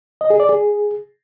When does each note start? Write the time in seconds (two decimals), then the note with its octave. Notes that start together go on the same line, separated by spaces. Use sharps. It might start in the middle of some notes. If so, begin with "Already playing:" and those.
0.21 D#5
0.30 G#4
0.40 D5
0.49 G#4